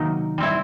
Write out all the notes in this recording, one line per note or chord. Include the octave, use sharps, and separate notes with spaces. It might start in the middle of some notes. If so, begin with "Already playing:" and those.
Already playing: C3 D#3 F#3 A#3 D#4
G3 C4 E4